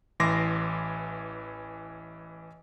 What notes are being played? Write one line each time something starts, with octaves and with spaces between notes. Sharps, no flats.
A1 E3 C6 D6 A#6 C7